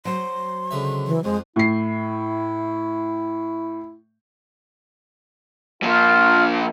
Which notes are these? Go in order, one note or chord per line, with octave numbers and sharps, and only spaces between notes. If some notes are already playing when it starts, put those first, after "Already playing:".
F#3 C5 C6
C#2 D3 E5
E3
F2 G#3 C5
A2 E4 C7
A#2 F3 F4